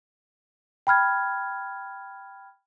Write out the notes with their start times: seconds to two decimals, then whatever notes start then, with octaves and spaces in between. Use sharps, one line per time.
0.87 G5 B5 F6 G#6